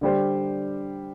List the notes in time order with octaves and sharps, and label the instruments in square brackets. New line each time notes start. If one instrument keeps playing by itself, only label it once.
[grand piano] D3 G3 D4 G4 C5